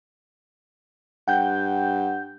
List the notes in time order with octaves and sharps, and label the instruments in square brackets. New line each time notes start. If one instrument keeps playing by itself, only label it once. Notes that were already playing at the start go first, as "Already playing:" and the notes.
[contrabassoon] G2 [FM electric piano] F#5 G5 G6